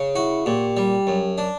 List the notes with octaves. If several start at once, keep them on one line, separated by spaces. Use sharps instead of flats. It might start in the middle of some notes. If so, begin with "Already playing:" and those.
Already playing: C#3
E4 F#4
A#2 G4
G3
F#2
D4